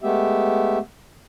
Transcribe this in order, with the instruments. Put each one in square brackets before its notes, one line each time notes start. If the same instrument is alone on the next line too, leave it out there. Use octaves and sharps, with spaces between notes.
[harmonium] G#3 A3 B3 G4 E5